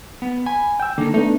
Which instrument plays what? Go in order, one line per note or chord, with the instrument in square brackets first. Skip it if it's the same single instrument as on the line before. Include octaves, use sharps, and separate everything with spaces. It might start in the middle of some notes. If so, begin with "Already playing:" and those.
[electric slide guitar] B3
[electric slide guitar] G#5 [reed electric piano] B5
[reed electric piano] G5 E6
[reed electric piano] D3 A4 [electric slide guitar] A#3 D#4
[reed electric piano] A3 B3 D4 [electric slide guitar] D#4